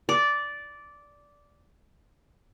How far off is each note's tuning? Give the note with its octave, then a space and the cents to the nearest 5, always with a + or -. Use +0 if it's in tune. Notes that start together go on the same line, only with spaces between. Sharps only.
D5 -10